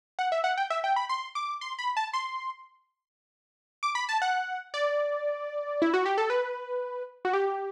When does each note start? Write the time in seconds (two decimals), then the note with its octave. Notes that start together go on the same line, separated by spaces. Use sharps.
0.19 F#5
0.32 E5
0.44 F#5
0.58 G5
0.70 E5
0.84 G5
0.96 B5
1.09 C6
1.35 D6
1.61 C6
1.79 B5
1.97 A5
2.13 C6
3.83 D6
3.95 B5
4.09 A5
4.22 F#5
4.74 D5
5.82 E4
5.94 F#4
6.06 G4
6.18 A4
6.30 B4
7.25 F#4
7.33 G4